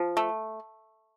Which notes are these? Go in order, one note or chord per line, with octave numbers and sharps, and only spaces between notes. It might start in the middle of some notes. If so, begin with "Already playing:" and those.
Already playing: F3
A3